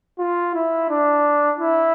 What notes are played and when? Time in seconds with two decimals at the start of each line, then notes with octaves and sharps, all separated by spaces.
0.19 F4
0.54 E4
0.90 D4
1.59 E4